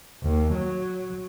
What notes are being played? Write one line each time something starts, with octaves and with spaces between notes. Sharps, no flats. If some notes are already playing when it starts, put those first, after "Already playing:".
D#2
F#3